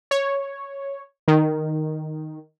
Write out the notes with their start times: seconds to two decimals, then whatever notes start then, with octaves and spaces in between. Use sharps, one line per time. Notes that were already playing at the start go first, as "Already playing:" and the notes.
0.11 C#5
1.28 D#3